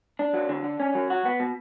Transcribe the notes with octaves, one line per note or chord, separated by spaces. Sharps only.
D4
F#3
D3
D4
C#4
F#3
F#4
B3
B2